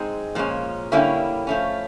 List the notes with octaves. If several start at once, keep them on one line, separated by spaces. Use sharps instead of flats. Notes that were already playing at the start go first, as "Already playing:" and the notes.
Already playing: G#3 C4 D#4 G#4
A#2 F3 G#3 C#4
D3 G3 A#3 C#4 E4
F3 A3 C#4